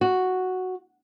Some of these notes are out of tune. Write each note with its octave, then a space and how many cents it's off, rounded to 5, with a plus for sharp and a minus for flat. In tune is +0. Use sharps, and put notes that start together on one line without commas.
F#4 +0